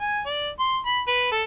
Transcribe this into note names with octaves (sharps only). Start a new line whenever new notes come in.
G#5
D5
C6
B5
B4
A4